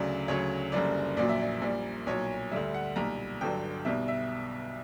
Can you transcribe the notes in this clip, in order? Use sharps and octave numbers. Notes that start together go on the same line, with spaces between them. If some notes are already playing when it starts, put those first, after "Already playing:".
Already playing: D2 C#3 F#3 D5
D2 C#3 F#3 C#5
F#1 F#2 D3 G3 D5
A#1 A#2 F#3 D5
E5
D5
A#1 A#2 G3
B1 A#2 F#3 C#5
D2 D3 G3 E5
F#5
B1 A#2 G3 A#5
G1 G2 D3 F#3 G5
B1 B2 G3 E5
E5